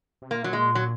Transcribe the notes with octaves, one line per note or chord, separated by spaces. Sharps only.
C3
A#2 A#3
F#3
G#3
F#3